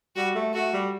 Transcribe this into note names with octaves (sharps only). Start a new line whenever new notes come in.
G3 F#4
A3
A3 F#4
G3